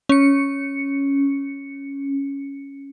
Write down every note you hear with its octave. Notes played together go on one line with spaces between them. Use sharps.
C#4 C#7